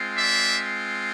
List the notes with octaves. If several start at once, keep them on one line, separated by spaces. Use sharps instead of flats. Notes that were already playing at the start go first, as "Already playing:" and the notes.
Already playing: G#3 C4 F4
D5 E5